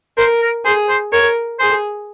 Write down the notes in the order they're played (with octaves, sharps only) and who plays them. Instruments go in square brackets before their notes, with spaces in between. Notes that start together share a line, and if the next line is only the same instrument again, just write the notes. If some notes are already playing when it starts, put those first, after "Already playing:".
[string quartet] A#4 [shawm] C5
[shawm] A#4
[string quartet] G#4 [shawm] C5
[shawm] C5
[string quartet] A#4 [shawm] C#5
[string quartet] G#4 [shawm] C5